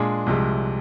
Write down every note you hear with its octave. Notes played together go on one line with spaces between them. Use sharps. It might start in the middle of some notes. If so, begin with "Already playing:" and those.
Already playing: A#2 G#3 D4 G#4
C2 C3 F3 G#3